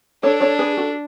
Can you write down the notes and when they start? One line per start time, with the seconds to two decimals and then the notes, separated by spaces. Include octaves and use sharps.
0.23 D4 A4 C#5
0.40 A4 C#5
0.59 G#4 B4
0.77 F#4 A4